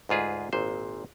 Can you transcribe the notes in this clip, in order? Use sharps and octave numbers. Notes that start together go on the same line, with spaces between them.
D2 G#2 F4 G#4 B4
G#1 A#2 C5